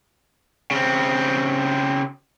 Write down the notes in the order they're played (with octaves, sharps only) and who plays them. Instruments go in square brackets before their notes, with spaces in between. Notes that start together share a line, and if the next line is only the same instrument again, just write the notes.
[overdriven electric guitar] C#3 C4